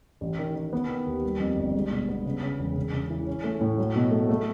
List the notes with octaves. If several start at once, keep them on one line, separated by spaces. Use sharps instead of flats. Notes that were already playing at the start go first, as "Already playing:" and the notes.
A1
D#3
D#3
B3
D#3
D#2
G3
F2
G1
G#3
B2
B3
C#3
C#3
E1
C#3
C#3
E3
C#4
A3
A2
F#3
B2
A3
A3